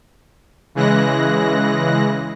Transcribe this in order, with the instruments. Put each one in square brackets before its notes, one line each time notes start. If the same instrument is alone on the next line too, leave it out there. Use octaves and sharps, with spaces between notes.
[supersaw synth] C#3 E3 G#3 F#6 A#6